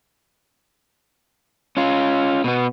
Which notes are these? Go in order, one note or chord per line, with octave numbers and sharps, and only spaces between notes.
C#4 F4
B2 B3